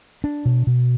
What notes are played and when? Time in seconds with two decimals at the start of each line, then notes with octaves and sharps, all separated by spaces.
0.24 D4
0.45 B2
0.67 B2